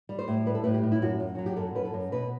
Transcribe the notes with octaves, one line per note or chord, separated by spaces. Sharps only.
G3
C5
A2
G3 B4
A4
A2 B4
G4
A2
E4
F#2 F#4
F#2
F#3 F#4
G4
F#2 A4
F#2 B4
A4
F#2
B2 B4